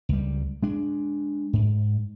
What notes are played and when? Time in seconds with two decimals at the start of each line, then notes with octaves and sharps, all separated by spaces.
0.09 C#2 G3
0.63 G#3 D4
1.53 G#2